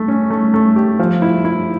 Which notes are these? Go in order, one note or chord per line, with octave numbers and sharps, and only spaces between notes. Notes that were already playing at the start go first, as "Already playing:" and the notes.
Already playing: A3
C#4
A3
A3
G4
F3
E4
E4